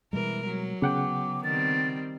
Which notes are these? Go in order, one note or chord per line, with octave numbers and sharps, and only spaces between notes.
B2 E3 G3 G#3 A#4
F#3
C#3 B3 F#5 G5 D6
D#3 G3 C4 A6